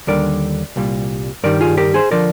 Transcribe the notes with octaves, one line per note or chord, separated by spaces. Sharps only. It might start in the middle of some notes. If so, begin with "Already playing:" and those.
D#2 D3 G3 A#4 D5
C2 A#2 G3
G2 D#3 G3 A#4 D5
F4 G#4
G4 A#4
G#4 C5
D3 F3 A#4 D5